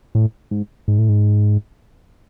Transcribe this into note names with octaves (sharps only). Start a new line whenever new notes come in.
A2
G#2
G#2
A2
G#2